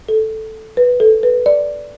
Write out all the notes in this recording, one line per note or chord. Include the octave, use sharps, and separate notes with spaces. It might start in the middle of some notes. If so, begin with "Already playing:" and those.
A4
B4
A4
B4
D5